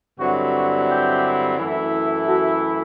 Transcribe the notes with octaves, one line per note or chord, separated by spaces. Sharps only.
G2 D3 F#3 C4 E4 F#4
F#4
G4
F#2 E3 A3 E4
F#4 A4